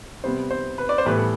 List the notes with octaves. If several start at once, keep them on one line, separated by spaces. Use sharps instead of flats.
C3 G3 B3 C5
C5
B4
D5
C5
A2 E3 G3 B3 B4
A4